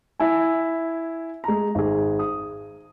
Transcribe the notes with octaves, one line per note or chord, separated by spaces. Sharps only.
E4 G#5
G#3 A#5
G#1 G#4
D#6